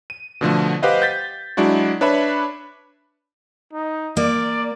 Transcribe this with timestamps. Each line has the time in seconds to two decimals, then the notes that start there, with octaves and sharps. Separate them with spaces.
0.10 D#7
0.41 B2 D3 F3 A3
0.82 G4 B4 C5 D#5 F5 F#5
1.02 G6 A6 B6
1.57 F#3 G#3 D4 E4 F#4
2.01 D4 B4 C#5 E5 B5
3.73 D#4
4.17 A#3 D5